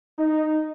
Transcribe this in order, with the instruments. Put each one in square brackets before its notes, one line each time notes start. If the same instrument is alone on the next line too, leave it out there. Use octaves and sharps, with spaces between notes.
[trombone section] D#4